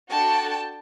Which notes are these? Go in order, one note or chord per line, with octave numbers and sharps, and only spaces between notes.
D4 F#4 A4 G5 A5